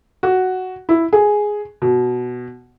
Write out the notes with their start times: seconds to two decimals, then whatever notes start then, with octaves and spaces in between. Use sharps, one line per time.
0.23 F#4
0.89 E4
1.13 G#4
1.82 B2